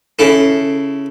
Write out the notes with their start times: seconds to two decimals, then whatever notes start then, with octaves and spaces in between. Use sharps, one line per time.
0.19 C#3 E4 A4